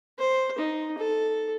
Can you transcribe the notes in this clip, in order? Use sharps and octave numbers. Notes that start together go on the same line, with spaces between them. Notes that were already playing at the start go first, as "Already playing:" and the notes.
C5
D#4
A4